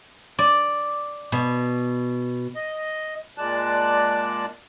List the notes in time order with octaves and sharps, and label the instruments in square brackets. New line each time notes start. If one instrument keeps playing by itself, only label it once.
[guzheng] D5
B2
[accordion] D#5
A#2 G#3 D5 A5 F#6